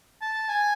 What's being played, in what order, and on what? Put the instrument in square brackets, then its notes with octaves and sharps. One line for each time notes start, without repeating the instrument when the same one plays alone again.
[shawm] A5
G#5